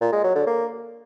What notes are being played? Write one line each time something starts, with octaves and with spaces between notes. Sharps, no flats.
A#2
G#3
F#3
D3
A#3